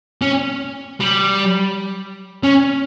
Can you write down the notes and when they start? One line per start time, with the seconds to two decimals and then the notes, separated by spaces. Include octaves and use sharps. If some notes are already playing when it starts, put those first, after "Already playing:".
0.22 C#4
1.01 G3
2.43 C#4